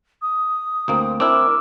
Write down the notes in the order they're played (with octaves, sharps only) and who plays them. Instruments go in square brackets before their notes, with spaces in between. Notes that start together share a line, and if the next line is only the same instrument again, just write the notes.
[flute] D#6
[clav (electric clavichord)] D2 A#3 C4
[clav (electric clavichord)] C4 D4 E4 [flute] A#4 [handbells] D6 E6